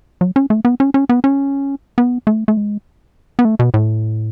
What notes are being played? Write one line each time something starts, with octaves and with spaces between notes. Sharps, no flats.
F#3
C#4
A3
B3
C#4
C#4
B3
C#4
B3
A3
A3
G#3
B3
A3
B2
A2